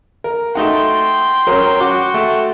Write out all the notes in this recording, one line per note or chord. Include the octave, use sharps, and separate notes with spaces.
A#4
A3 D#4 F#4 G5 C6
F#3 C#4 A#4
F#4 D6
A3